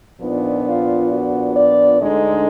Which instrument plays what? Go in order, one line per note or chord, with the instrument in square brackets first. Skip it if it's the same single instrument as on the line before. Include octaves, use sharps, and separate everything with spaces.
[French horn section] A#2 F3 B3 D4 D#4
F4
F#4
D5
D2 D3 G#3 D#4 D#5